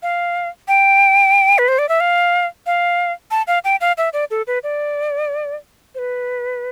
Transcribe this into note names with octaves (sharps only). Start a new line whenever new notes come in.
F5
G5
B4
C5
D5
E5
F5
F5
A5
F5
G5
F5
E5
D5
A4
B4
D5
C5
B4